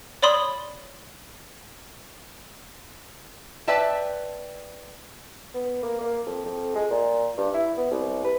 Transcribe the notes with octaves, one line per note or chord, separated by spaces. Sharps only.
C#5 D5 B5 C6 D#6
B4 D5 E5 G5 A5
B3
A#3
A#3
F2
F2
G#3
A#2
G2
E4
B3
C2
B4